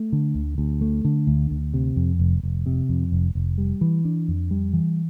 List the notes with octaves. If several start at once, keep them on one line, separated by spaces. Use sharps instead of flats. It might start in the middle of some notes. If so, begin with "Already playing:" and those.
Already playing: A3
D3
D2
D2
A3
D3
D2
D2
C3
F2
F1
F1
C3
F2
F1
F1
G3
E3
D4
F2
G3
E3